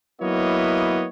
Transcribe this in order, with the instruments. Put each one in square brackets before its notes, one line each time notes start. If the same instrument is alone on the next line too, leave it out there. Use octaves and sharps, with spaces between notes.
[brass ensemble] F#3 A#3 B3 E4 C#5 D#5